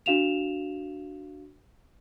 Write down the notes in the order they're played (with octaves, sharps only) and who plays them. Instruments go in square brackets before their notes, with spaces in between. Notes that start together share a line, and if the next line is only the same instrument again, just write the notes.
[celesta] D4 F#4 F5 E7 F7